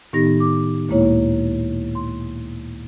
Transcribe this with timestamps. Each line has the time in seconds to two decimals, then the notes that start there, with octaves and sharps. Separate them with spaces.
0.13 A2 D#3 B3 D#4 G4 A#6
0.40 D6
0.89 D2 A#2 G#3 A#3 E4 C#5
1.95 C6